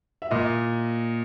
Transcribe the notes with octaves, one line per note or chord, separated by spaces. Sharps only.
E5
A#2 D#5